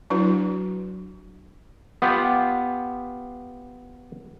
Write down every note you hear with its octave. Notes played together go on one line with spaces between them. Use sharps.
F#3 D4 E4 F#4 B4
B3 F4 G4